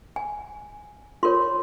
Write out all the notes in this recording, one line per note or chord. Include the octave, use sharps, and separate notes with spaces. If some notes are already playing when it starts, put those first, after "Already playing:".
G#5
F4 A#4 C#5 C6